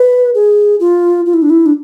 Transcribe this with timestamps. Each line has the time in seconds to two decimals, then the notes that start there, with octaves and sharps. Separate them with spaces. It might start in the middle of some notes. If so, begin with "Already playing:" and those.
Already playing: B4
0.35 G#4
0.80 F4
1.26 F4
1.34 E4
1.42 D4
1.50 E4
1.66 D4